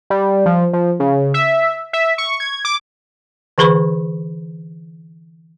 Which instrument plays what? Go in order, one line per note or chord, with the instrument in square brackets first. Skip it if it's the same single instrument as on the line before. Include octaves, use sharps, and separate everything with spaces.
[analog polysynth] G3
F3
F3
C#3
E5
E5
C#6
G#6
D6
[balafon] D3 E3 G#4 B4 B5 C#6